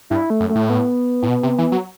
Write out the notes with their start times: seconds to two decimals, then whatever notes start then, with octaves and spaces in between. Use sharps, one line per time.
0.10 G2 E4
0.30 A3
0.40 F#2
0.49 A3
0.55 A2
0.70 B3
1.23 A2
1.28 B2
1.43 C3
1.58 E3
1.72 F#3